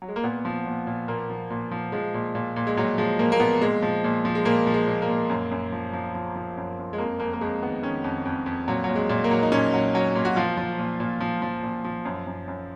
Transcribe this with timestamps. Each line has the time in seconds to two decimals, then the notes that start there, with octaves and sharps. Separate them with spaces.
0.02 F#3
0.08 G#3
0.16 A#3
0.23 A#2 B3
0.45 F3
0.66 A#2
0.87 A#2
1.08 A#2 A#3
1.30 F3
1.50 A#2
1.71 F3
1.92 F3 G#3
2.14 A#2
2.35 A#2
2.56 A#2
2.67 G#3
2.77 A#2 F#3
2.98 F3 G#3
3.19 A#2 A#3
3.32 A#3
3.40 A#2 B3
3.61 A#2 G#3
3.82 F3
4.04 A#2
4.25 F3
4.35 G#3
4.45 A#2 A#3
4.67 F3
4.74 G#3
4.87 A#2
5.02 A#3
5.09 A#2
5.30 F#2
5.51 F#2
5.72 F3
5.93 F3
6.15 F3
6.36 F3
6.57 F#2
6.78 F#2
6.93 G#3
6.98 F2 A#3
7.20 F2 A#3
7.33 A#3
7.41 F2 G#3
7.62 D#3 B3
7.83 D#3 C#4
8.04 F2
8.25 F2
8.46 F2
8.68 A#2 F#3
8.84 F#3
8.89 A#2
8.96 G#3
9.09 A#2
9.24 A#3
9.31 F#3
9.43 D#4
9.52 A#2 C#4
9.74 F#3
9.95 F#3
10.15 A#2
10.25 F#4
10.36 F3 F4
10.57 F3
10.79 A#2
11.00 A#2
11.21 F3
11.42 F3
11.63 A#2
11.84 F3
12.05 F#2
12.27 F#2
12.47 F#2